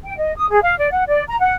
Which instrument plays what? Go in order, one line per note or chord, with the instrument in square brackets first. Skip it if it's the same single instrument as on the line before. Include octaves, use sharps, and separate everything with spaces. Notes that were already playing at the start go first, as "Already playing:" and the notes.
[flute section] G5
D#5
D#6
G#4
F5
D5
F#5
D5
A#5
F#5